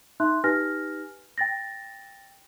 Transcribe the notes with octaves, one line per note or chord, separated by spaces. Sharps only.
D#4 E5 C6 F#6
D#4 G4 B4 G#5 F6 A#6
G5 A6 A#6